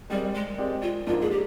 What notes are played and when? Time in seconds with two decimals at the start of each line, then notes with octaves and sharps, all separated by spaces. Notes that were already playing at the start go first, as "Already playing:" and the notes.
0.10 G3 G#3 C4 G4 A#4 D5
0.35 G#3
0.58 G#3 C4 G4 A#4 D5
0.82 F4
1.07 G#2 F3 A#3 D4 F4
1.21 G#4
1.31 G4